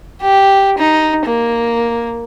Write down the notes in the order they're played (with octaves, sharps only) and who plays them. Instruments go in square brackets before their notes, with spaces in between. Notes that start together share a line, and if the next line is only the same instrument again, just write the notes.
[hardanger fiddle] G4
D#4
A#3